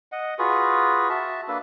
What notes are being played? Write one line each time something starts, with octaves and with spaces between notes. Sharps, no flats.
D#5 F#5
F4 F#4 G#4 B4
F#4 E5 A5
A#3 D4 A4 B4